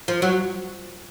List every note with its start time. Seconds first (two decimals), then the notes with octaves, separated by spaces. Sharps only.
0.08 F3
0.22 F#3